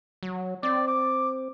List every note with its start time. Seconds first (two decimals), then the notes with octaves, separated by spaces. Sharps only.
0.23 F#3
0.63 C4 D5
0.88 D6